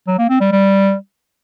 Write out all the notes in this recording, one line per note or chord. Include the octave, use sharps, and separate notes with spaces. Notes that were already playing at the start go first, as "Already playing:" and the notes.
F#3
A#3
C4
G3
G3